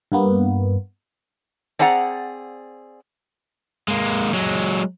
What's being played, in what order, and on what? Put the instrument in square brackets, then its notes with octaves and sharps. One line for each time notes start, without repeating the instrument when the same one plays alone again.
[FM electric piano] G2 A#3 B3
[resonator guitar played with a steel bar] C4 D4 G#4 D5 F#5 A#5
[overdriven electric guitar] G#3 A#3
F#3 G#3